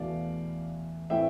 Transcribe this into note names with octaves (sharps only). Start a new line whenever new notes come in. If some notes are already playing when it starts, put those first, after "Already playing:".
Already playing: E2 B2 A3 D5 F5
A2 E3 A3 C4 E5 G5